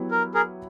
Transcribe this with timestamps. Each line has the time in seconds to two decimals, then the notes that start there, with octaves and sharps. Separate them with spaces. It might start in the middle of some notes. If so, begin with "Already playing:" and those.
Already playing: F#3 B3 E4 G4 B4
0.11 A#4
0.34 G#4 A#4